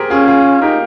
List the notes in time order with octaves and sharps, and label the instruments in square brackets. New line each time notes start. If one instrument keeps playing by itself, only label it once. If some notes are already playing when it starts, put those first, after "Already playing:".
Already playing: [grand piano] G4 G#4 A#4 C5
[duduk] C#4 [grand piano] F4 G#4
[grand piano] F4 G#4
[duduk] D#4 [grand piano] G4 A#4